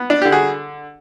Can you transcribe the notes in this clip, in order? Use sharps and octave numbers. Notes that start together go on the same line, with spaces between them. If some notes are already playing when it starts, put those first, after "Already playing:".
Already playing: B3
D4
D3 G4
F#4 G#4